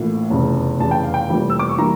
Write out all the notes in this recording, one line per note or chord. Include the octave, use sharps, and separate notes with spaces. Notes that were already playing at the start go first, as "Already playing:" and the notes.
Already playing: A#1 A2 E3 A#3
F1 E2 C#3
F1 E2 C#3 A5
G5
F5
G5
F1 F2 E3 G3 A#3
E6
D6
C#6
E3 G3 A#3 A#5